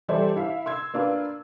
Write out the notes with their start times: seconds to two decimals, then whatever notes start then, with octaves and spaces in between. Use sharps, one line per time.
0.08 E3 G3 E4 A4 C5 D5
0.36 E4 E5 F5
0.66 C6 E6 G#6
0.94 A#3 D4 F4 B4